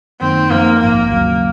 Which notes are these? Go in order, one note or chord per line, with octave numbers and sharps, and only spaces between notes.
F#2 D#3 A#3 C4 D#4
F#2 F3 A#3 C4 D#4
A#1 G#2 F3 A#3
D#2 C#3 F#3